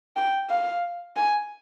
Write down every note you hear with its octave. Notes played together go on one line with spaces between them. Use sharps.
G5
F5
G#5